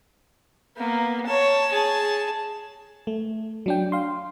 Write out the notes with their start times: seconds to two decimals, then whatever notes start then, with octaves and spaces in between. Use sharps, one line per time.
0.77 A#3 B3
1.26 C#5 A5
1.72 G#4 A5
3.07 A3
3.66 F#3 D4 G5
3.92 F5 C6